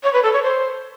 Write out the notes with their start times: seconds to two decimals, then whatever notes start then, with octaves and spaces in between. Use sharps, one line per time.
0.03 C#5
0.13 B4
0.23 A4
0.33 C#5
0.43 C5